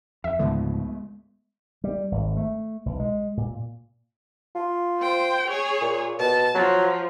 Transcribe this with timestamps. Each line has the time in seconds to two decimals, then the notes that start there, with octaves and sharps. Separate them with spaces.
0.24 F2 E5
0.39 C#2 G#2 D3 F3 G#3 A3 B3
1.84 G3
2.12 G#1
2.37 A3
2.86 B1
3.00 G#3
3.37 A#2
4.55 F4
5.00 C5 G5
5.49 G#4 C#5
5.81 A#2
6.19 B2 A5
6.55 F3 F#3